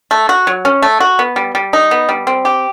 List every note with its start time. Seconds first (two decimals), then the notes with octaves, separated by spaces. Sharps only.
0.11 A3
0.29 F#4
0.47 F#3
0.65 C#4
0.82 A3
1.00 F#4
1.19 B3
1.36 G3
1.55 G3
1.73 D#4
1.91 B3
2.09 G3
2.27 C4
2.45 G4